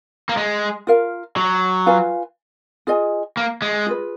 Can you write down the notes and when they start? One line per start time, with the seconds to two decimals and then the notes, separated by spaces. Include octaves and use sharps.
0.29 A#3
0.37 G#3
0.87 F4 A#4 F5
1.36 F#3
1.86 F4 B4 F5 G#5
2.87 F4 G#4 D#5 G#5
3.37 A#3
3.62 G#3
3.86 F4 G#4 B4